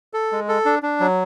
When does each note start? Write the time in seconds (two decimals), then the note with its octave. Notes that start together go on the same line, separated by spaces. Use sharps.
0.14 A4
0.32 G#3
0.49 A4
0.65 D4
0.83 D4
1.00 F#3